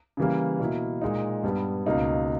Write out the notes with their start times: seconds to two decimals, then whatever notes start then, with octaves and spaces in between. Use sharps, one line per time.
0.17 C#3 E3 G3 A#3
0.60 B2 A#3 E4
1.02 A#2 G#3 D#4
1.43 G2 G3 B3
1.86 C#2 B2 A#3 D#4